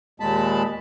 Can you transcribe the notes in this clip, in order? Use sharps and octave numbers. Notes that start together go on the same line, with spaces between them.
D#2 A#2 G#3 A5 B5